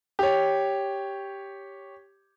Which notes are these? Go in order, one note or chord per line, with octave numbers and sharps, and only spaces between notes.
G4 C#5